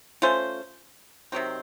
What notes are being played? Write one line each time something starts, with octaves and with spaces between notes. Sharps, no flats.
A3 C#4 F4 C5
C3 D#3 F#3 C4